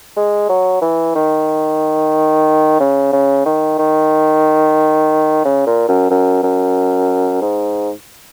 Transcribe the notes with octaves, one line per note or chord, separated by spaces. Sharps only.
G#3
F#3
E3
D#3
C#3
C#3
D#3
D#3
C#3
A#2
F#2
F#2
F#2
G#2